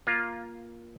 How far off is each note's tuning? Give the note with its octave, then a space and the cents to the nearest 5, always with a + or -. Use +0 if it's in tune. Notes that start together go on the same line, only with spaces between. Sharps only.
A#3 +10 F4 +0